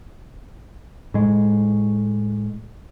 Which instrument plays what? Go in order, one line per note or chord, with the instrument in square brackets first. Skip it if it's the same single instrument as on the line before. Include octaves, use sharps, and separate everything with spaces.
[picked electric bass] A2 G#3